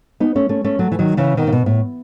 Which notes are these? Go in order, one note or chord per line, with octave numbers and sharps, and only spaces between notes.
B3 D#4
A3 C#4
A3 C#4
A3 C#4
F#3 A3
E3
D#3 F#3
C#3 E3
B2 D#3
C#3
B2
A2